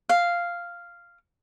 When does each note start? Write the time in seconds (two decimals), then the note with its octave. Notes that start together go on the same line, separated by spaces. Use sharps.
0.09 F5